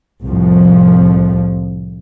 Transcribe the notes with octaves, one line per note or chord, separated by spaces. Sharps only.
C2 F2 A2 F3